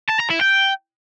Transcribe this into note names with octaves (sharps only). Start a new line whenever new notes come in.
A5
A#5
E4
G5